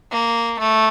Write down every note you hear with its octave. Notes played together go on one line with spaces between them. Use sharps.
A#3
A3